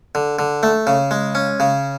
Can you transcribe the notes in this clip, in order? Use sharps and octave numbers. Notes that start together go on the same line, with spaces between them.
D3
D3
A3
C#3
G#3
C#4
C#3